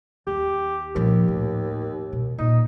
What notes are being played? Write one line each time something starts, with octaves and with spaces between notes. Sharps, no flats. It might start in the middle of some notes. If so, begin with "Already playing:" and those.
D#2 G4
D#2 A#2 F3
A2
B2
A#2 D#4